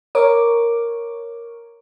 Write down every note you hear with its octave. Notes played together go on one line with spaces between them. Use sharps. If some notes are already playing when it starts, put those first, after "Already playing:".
A#4 C#5 D6